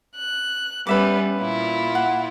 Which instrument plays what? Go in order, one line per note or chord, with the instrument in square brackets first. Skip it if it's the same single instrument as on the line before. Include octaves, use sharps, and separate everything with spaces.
[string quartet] F#6
[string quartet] G3 B3 C#4 [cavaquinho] B4 E5 D6
[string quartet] A#2 E4 F4
[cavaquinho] F#5